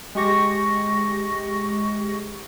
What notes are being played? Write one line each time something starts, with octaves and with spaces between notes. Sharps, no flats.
G#3 G4 C#6 A#6